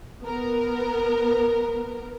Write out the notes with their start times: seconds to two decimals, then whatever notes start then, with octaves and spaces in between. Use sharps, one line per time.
0.22 B3 A#4